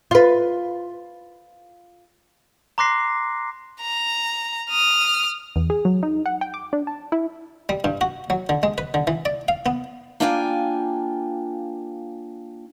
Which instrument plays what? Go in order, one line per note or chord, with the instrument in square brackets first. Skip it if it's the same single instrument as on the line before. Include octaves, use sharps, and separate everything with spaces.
[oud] F4 B4
[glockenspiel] A#5 C6 D6 F#6 A#6 C7
[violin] A#5
D#6 F6
[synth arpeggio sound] E2
G#4
F#3
D#4
F#5
G5
D6
D4
A5
E4
[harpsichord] G3
G2
F#4
F#3
D3
G#3
B4
D3
E3
D5
F5
B3
[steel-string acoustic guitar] A#3 D4 E4 F4 G5 G#5